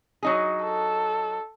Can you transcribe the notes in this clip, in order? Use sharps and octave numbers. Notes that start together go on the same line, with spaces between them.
F#3 D#4 G#4
A4